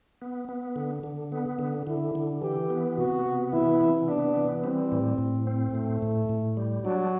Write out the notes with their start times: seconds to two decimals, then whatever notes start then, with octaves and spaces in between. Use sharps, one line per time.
0.22 B3
0.49 B3
0.76 D3
1.03 D3
1.32 B3
1.59 D3
1.87 D3 E4
2.15 D3
2.42 E3 G4
2.70 B3
2.98 C3 F#4
3.26 B3
3.53 E3 E4
3.81 C3
4.08 B3 D4
4.36 E3
4.64 G3 C4
4.92 A2
5.18 A2
5.47 C4
5.74 A2 A3
6.02 A2
6.29 A2
6.57 G3
6.85 F#3 D4